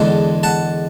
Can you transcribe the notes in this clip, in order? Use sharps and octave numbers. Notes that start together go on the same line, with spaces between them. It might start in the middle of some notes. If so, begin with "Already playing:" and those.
Already playing: E2 D3 G#3 D4 F#5 A5
F#5 A5